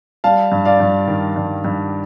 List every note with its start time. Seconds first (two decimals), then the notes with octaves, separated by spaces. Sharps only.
0.24 G3 F5 A5
0.52 G2
0.65 D5 F5
0.80 G2
1.08 D#3
1.36 G2
1.65 G2